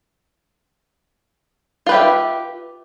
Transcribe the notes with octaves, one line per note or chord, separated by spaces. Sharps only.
F4 G4 B4 E5